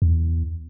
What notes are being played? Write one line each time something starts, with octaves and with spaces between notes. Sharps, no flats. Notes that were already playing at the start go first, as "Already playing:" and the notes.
E2